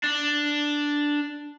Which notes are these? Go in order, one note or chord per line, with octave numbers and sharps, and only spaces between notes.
D4